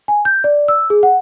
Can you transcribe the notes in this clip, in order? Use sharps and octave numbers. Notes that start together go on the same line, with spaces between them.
G#5
G6
D5
E6
G#4
F#5